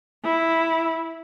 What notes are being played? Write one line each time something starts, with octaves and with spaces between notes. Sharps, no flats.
E4